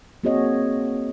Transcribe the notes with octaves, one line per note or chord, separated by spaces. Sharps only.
A#3 C4 F#4 G#4 C#5 D#5